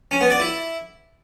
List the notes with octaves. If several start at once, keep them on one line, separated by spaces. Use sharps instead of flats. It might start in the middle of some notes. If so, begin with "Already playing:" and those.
C#4
B3
D5
E4